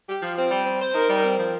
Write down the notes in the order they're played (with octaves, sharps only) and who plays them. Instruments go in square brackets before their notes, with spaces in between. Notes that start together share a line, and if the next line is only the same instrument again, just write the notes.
[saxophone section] G4
F3
C4
G3
C4
C5
[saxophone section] D#4 [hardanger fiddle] A#4
[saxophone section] G3
C4
F3